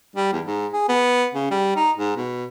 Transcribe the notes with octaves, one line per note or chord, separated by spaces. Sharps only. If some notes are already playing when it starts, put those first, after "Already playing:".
G3
E2
G#2
G#4
B3
C#3
G3
D#4
G#2
B2